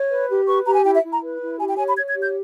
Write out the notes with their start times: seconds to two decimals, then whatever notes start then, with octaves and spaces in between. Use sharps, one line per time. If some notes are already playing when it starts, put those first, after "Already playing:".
Already playing: C#5
0.10 B4
0.30 G4
0.48 B4 C#6
0.66 G4 A#5
0.76 G#5
0.85 E4 G5
0.94 E5
1.04 E4
1.13 A#5
1.22 B4
1.41 E4
1.60 G4 G#5
1.69 G5
1.78 C#5 G#5
1.88 B5
1.97 C#5 G#6
2.09 G#6
2.15 G4
2.21 G6